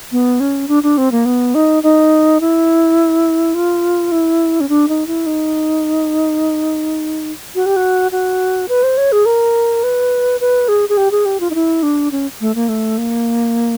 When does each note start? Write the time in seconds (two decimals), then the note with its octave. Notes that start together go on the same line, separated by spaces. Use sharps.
0.12 B3
0.40 C#4
0.68 D4
0.83 D4
0.98 C4
1.12 A#3
1.25 B3
1.55 D#4
1.83 D#4
2.41 E4
3.54 F4
4.12 E4
4.60 C#4
4.69 D4
4.89 D#4
5.07 E4
5.26 D#4
7.55 F#4
7.66 G4
7.76 F#4
8.12 F#4
8.69 B4
8.83 C5
8.97 C#5
9.12 G#4
9.26 A#4
9.83 B4
10.41 B4
10.68 G#4
10.89 G#4
10.97 G4
11.11 G#4
11.26 G4
11.40 F4
11.51 D#4
11.55 E4
11.83 D4
12.12 C#4
12.41 A3
12.55 A#3
12.69 A3
12.98 A#3